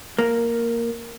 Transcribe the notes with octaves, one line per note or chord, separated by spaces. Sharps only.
A#3